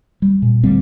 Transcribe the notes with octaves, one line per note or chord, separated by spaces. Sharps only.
G3
A#2
D2 G3 C4